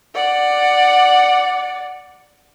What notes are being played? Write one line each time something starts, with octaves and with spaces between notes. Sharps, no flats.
D5 F#5